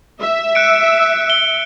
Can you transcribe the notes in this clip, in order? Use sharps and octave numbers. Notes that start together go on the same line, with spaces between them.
E5
F#6 C#7 D7
G7